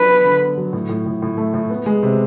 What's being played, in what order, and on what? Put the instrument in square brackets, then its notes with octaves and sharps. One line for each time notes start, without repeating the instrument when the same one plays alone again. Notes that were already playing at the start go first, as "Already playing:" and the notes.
Already playing: [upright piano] F#3 D4 [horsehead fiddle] B4
[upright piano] B3
D3
B3
F#3
A2
A2
A2
A2
A3
A2
B3
G#3
C3